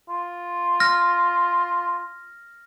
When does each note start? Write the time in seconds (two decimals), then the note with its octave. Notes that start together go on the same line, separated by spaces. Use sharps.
0.09 F4
0.80 F6 A#6